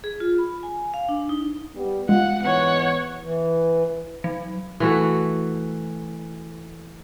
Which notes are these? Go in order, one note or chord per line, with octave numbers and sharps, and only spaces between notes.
G#4
F4
B5
G#5
F5
D4
D#4
G3 B3
G#3 F4 F#5
G#2 E3 B3 C#5 F#5
E3
F#3
E3 A3 F#4